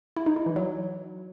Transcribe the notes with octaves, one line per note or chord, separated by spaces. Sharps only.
E4
D#4
E4
E3
F#3